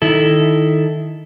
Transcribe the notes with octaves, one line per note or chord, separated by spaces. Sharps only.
D#3 E4 A4